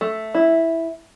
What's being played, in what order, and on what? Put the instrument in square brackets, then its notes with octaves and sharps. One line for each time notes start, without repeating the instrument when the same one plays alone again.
[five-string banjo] A3
E4